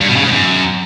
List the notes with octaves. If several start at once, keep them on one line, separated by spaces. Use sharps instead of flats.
G2
B2
C#3
G#2
F#2